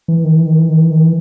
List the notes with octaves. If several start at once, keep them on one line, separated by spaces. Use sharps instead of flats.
E3
D#3
E3
D#3
E3
D#3
E3
D#3
E3